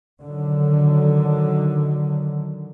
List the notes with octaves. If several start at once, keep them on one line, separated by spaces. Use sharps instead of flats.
D3 D#3 F#3